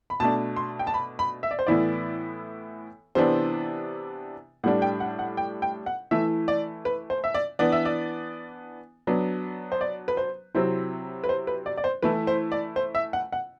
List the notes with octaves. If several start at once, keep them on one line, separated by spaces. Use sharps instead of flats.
B5
B2 A3 D4 A5
C6
G5
A5
B5
B5
E5
D5
C5
A2 E3 B3 E4 D5
C3 E3 B3 D4 C5
A2 G3 D4 F#5
G5
F#5
F#5
G5
G5
F#5
E3 A3 E4 E5
D5
B4
C5
E5
D5
E3 B3 D4 D5
E5
D5
F#3 B3 D4
C5
D5
B4
C5
C3 F#3 C4 E4 C5
B4
C5
B4
D5
D5
C5
E3 A3 E4 B4
C5
D5
C5
E5
F#5
F#5